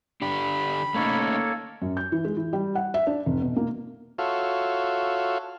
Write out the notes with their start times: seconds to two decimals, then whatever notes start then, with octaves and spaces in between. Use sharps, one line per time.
0.22 D3 D4 G4 B5
0.95 A3 A#3 C#4 D#4 A4 C#5
1.82 F#2
1.97 G6
2.12 E3
2.25 G#3
2.37 E3
2.53 G3
2.75 F#5
2.94 E5
3.07 D4
3.26 F1
3.42 B2
3.56 A#3
4.18 F4 F#4 A4 C#5 E5 F5